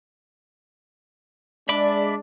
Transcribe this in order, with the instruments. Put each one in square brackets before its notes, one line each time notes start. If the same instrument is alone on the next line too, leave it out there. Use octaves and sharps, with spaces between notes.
[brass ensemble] G#3 D4 [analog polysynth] D5 [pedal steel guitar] E5 B5 D6